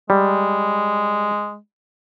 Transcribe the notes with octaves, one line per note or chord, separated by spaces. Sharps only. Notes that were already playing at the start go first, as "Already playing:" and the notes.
G3 G#3